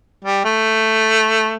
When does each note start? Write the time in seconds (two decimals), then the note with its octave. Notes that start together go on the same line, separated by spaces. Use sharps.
0.24 G3
0.45 A3